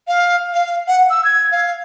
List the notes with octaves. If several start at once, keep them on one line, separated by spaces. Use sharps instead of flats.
F5
F5
F#5
E6
G#6
F5